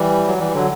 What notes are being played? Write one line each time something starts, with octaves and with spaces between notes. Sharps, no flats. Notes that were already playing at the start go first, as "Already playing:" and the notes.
Already playing: E3 G3
F#3
E3 G3
D3 F#3